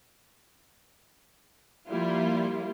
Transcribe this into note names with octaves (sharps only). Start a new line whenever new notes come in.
F3 G3 A#3 E4 F4